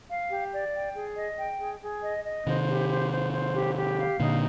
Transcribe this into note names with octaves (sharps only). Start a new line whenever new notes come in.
F5
G4
D5
G5
G#4
D#5
G5
G#4
G#4
D#5
D#5
C3 D#3 C5
G4
C5
C5
C5
G4
G4
F5
A#2 D3 D#4